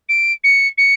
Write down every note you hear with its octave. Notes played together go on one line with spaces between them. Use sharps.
D7
C#7
C#7